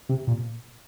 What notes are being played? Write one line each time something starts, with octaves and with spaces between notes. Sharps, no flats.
C3
A#2